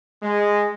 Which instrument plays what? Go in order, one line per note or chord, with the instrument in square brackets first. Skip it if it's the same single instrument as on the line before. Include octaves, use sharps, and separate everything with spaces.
[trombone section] G#3